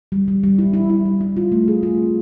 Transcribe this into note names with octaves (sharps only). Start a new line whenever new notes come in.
G3
G3
G3
E4
E4
E4
G3
E4
F4
A3
G#4
F4
C4